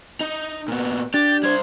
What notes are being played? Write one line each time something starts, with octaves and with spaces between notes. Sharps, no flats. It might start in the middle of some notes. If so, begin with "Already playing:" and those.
D#4
A#2 B3
D4 G4 A6
G3 C5 G#6